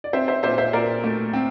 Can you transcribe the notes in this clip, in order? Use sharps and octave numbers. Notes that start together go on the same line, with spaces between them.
D5
C4 C5 E5
C5 E5
A#2 C5 E5
C5 E5
A#2 A#4 D5
A3
C4